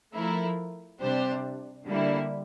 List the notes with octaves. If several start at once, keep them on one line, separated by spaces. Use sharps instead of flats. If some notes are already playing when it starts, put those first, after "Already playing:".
F3 A3 E4 A#4
C3 G3 D4 G4 C5
D3 G3 A#3 E4